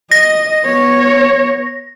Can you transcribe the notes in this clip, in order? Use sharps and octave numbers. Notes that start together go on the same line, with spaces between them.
D#5 A#6
B3 C#5